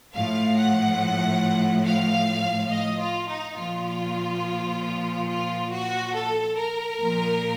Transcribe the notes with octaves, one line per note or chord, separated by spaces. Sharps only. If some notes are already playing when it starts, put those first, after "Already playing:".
A2 F3 F5
F#5
F5
D#5
F4
D#4
A#2 F3 F4
F4
F#4
A4
A#4
A#2 F3